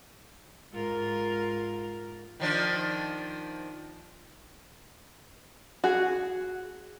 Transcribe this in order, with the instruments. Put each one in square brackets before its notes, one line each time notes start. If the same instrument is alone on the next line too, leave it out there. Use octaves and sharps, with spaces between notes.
[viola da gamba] G#2 F4 A#4
[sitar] D#3 F3 D4
[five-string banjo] F#4 G#4